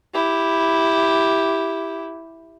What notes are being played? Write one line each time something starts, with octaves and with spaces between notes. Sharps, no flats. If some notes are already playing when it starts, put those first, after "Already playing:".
E4 G4